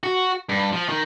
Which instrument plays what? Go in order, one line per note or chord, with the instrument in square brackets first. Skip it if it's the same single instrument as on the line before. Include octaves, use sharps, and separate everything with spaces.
[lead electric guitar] F#4
G2
F3
D#3